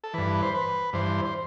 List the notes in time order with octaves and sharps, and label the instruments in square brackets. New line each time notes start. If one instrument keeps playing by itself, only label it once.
[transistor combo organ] A4
G2 E3 B4
C5
B4
G2 E3 C5
C5